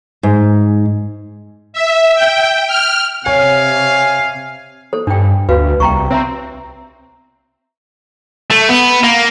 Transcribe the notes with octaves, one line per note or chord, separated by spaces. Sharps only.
G#2
E5
G5
F6
C3 C#5 F5 G#5
A4 C5
G2 D4 G5
D2 F#4 B4 F5
C2 G5 A#5 C#6
C4 C5 E5 A#5
A3
B3
A#3